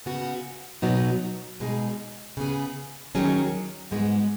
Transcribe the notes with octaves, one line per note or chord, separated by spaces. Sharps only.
C#3 B3 F#4
B2 F#3 B3 D#4
B2 G#3 D#4 G#4
C#3 B3 G#4
D#2 D#3 F#3 C#4 G#4
G#2 G#3 B3 F#4